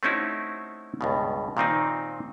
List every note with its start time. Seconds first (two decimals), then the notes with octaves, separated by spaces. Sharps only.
0.03 A3 C4 C#4 D#4 E4 F#4
1.01 C#2 G2 B2
1.57 A#2 D#3 C4 D#4